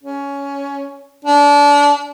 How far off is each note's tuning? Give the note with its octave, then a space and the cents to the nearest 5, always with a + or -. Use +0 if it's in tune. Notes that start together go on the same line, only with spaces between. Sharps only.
C#4 +15
D4 -25